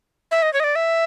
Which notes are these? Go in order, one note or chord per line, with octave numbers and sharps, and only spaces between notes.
E5
D#5
C#5
D#5
D5
E5